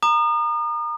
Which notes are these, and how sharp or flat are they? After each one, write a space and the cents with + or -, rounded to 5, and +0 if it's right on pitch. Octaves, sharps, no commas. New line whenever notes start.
A#5 +0 D#6 -40